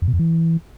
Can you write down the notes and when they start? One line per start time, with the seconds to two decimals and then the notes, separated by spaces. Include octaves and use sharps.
0.02 F2
0.08 B2
0.13 F2
0.19 E3